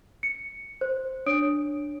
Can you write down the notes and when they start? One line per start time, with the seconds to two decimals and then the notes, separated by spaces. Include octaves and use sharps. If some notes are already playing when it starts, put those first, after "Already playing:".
0.23 C#7
0.81 C5
1.26 D4 C#5 D#6 D7